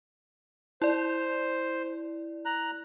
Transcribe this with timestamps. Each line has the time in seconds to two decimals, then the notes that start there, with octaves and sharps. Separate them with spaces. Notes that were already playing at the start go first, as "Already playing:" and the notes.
0.82 E4 C5 D5
2.45 A#5 F#6